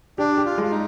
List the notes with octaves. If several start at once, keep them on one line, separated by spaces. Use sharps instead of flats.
D4 G4
G4
F4
G#3
F4
D#4